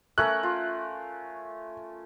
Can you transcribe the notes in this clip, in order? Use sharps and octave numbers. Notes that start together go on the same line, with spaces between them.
A3 C#4 A#4 F#6
F4